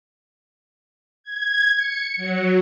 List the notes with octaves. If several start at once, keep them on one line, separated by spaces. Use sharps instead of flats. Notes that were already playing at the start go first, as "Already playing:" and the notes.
G#6
C#7
F#3